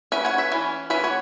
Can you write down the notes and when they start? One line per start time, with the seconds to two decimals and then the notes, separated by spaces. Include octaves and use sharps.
0.12 F#3 C#4 B4 E5
0.25 C#5 F#5
0.38 B4 E5
0.52 E3 C#4
0.90 E3 C#4 B4 E5
1.04 C#5 F#5